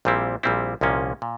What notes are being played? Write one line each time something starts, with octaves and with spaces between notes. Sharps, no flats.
A#1 A#2 G3 C4 E4
A#1 A#2 G3 C4 E4
C2 A#2 F3 A#3 C#4
A#2